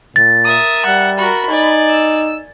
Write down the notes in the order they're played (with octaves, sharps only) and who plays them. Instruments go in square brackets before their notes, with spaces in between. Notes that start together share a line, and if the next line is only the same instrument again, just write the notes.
[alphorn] A#2 [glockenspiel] A6
[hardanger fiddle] A#4 E5 [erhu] D#6
[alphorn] G3 [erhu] F#5
[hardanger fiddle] F#4 A#4 [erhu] B5
[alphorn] D#4 [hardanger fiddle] D5 G#5
[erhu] E6